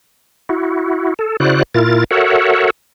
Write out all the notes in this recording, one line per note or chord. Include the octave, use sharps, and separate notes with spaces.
E4 F#4
A4
C#3 E4 F#4 C5 D5 F#6
A#2 E4 F4 A#4 A6
F#4 A4 A#4 C#5 E5 F#5